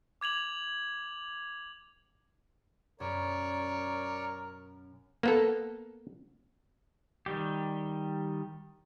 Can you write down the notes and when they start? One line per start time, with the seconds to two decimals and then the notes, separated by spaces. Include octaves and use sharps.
0.21 D6 G#6 F7 F#7
3.00 F#2 B2 C#4 A#4 C#5 D5
5.23 A#3 B3 A4
7.26 D#3 G3 G4